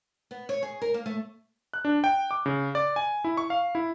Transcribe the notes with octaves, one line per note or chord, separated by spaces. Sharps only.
B3
C#5
G#4
A#4
A#3
A3
F#6
D4
G5
D6
C#3
D5
G#5
E4
C#6
F5
E4